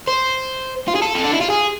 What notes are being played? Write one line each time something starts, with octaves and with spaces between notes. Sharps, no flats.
C5
F4
G#4
A4
C4
D4
E4
F4
G#4